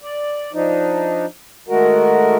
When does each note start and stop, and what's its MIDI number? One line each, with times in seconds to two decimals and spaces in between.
0.02 0.52 74
0.53 1.26 53
0.53 1.26 62
0.53 1.26 63
1.69 2.37 51
1.69 2.37 56
1.69 2.37 57
1.69 2.37 66
1.69 2.37 70